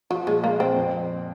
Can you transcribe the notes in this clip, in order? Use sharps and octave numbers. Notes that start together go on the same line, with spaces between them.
F3 F#3
A#2 G#3
G#3 A#3
A#2 C4
F2